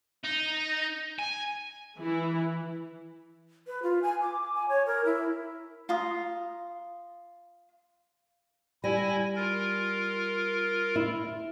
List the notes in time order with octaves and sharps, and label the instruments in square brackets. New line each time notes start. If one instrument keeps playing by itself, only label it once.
[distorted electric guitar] D#4
G#5
[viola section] E3 E4
[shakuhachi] B4
F4
G#5
D6
G#5
C#5
A#4
E4
[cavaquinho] F4 A#5 D#6
[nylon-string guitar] G3 [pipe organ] E4 G#5 A#6
[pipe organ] F4 A#4
[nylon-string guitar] E4